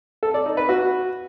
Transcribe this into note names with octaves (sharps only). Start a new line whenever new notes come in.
A4
D5
D#4
B4
F#4